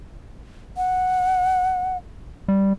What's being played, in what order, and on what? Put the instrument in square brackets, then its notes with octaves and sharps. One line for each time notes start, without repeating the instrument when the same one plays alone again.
[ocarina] F#5
[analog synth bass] G3